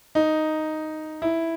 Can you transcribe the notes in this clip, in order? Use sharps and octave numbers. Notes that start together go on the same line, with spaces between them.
D#4
E4